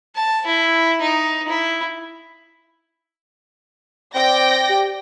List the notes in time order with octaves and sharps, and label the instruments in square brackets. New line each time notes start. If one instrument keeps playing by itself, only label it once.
[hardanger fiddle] A5
E4
D#4
E4
[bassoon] C4 [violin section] D5 G5 A#6
[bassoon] G4